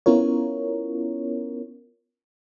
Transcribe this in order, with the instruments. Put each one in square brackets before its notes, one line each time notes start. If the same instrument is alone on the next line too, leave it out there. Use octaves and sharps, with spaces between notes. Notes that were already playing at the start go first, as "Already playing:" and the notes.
[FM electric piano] B3 C#4 E4 F4 A#4 C#5